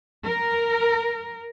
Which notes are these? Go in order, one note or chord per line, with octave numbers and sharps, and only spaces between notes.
A#4